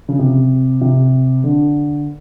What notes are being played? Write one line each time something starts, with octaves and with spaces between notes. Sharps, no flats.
C#3
C3
C3
D3